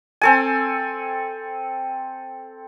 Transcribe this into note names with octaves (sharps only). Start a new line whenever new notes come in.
C4 A4 G#5